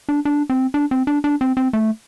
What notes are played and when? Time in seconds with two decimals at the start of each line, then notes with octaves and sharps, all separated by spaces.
0.09 D4
0.25 D4
0.50 C4
0.74 D4
0.91 C4
1.07 D4
1.24 D4
1.41 C4
1.57 C4
1.73 A3